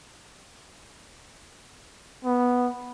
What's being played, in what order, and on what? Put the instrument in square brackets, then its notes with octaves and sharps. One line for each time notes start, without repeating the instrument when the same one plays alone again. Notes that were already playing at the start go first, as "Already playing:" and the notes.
[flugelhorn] B3